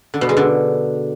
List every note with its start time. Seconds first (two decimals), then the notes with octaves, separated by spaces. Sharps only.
0.14 D3
0.21 B2
0.29 G#3
0.37 D3